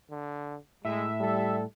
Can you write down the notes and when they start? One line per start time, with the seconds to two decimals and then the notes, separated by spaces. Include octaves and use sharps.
0.10 D3
0.85 A2 G#3 E5
1.20 G3 A4